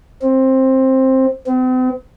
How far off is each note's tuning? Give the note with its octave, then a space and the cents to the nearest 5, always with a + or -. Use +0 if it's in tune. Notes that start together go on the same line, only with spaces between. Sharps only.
C4 +10
C4 -45